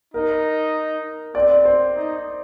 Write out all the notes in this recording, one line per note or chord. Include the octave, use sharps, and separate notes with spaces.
D#4 A#4
C4 D5
C5
D#4